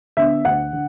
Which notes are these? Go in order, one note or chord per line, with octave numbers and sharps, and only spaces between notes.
D3 B3 D4 E5
D2 F#5
D3